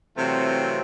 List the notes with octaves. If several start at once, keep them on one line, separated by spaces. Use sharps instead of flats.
C3 E3 F#3 A3 C4 F4